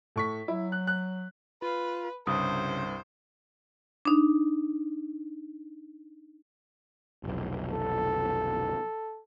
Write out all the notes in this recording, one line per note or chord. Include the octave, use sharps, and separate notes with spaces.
A2 C#6 B6
F#3 E4
F#6
F#6
F4 B4
C2 G2 C#3 C5 D#6
D4 D#4
F1 B1
A4